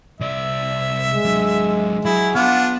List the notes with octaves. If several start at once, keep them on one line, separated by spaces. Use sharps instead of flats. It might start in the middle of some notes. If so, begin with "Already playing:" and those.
C2 D5 E5
G#3
F#3 D4
F#3 E4 G#4
B3 D4 F4 F#5